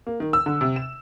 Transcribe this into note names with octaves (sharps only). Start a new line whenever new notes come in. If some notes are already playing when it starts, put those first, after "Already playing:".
A#3
D#3
E6
D3
C3
E7